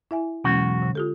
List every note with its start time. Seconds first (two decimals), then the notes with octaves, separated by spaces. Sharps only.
0.11 E4 E5 G#5
0.44 B1 E2 G#3 C#4 F#4
0.82 D3
0.95 F4 G4 A4